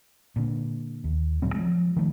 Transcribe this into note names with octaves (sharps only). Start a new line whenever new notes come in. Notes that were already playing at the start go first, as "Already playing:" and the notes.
A#2 D3
D#2
D2 A#2 F#3 C4
F3 G#3
D#3 F3 A3